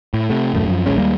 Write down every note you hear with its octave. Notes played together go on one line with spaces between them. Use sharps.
A2
C3 A3
D#1 F#2 A3
F#2 F3
D#1 A#1 G#3 C#4
D#2 G3 G#3 A#3